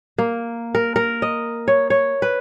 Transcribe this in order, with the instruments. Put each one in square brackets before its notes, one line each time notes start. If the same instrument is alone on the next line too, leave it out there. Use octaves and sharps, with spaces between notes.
[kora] A#3
A#4
A#4
D#5
C#5
C#5
B4